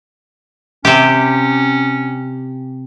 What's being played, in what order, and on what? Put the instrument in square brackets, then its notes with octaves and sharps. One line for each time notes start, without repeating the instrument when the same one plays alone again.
[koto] C3 G4 [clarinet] C#4